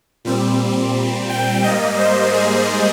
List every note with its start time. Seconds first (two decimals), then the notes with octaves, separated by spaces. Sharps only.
0.25 A#2 G3 C4
1.29 G5
1.64 G#2 G3 A#3 D#5
1.98 C5
2.33 G#4